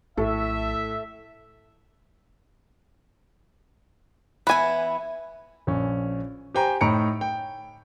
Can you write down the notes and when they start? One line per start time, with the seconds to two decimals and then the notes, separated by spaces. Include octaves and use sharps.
0.17 A#1 A2 A4 E5
4.47 E3 B3 E4 B4 G#5
5.67 A#1 C#4
6.54 G4 C5 G5 G#5 A#5
6.81 A2 D#4 A#5 B5 C#7 D7
7.21 G5